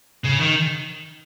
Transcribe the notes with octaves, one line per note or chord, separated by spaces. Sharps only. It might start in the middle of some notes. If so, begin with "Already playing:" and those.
C#3
D#3